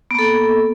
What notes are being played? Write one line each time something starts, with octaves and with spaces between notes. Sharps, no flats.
A#3 B3 A4